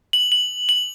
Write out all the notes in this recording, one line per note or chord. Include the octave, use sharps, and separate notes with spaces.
F#7
F#7
F#7